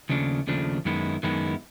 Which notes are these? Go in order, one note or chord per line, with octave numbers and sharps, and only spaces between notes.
D#2 C#3 F3 A3 D4
D#2 C#3 F3 A3 D4
F#2 D#3 G#3 B3 E4
F#2 D#3 G#3 B3 E4